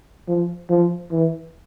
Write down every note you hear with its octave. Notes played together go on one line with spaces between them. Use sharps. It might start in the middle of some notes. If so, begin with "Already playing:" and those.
F3
F3
E3